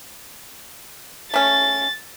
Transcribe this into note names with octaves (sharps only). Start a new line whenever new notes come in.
A3 C#4 A6